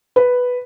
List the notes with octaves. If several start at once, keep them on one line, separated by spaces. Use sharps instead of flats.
B4